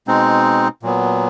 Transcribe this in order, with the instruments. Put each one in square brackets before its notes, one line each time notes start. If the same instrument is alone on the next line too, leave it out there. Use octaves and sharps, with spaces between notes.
[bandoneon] B2 G#3 C4 D#4
A#2 F#3 B3